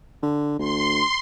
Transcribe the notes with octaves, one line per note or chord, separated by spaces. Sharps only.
D3
D2 C6